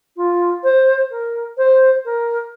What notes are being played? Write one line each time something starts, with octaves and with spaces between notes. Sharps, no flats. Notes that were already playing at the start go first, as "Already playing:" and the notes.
F4
C5
A#4
C5
A#4